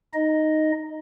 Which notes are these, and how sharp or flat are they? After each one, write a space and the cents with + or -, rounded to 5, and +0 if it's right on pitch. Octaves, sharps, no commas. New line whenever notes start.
D#4 -5 D#5 +0